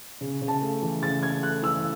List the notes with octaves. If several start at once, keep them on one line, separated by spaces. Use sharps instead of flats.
C#3
C#3
A5
A3
E3
C#3 A6
C#3 G#6
A3 F#6
E3 E6